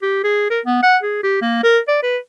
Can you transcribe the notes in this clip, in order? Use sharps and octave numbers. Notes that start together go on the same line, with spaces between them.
G4
G#4
A#4
B3
F#5
G#4
G4
A#3
A#4
D5
B4